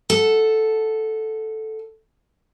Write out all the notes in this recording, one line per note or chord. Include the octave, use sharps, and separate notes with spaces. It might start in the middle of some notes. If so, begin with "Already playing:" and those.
A4 F#5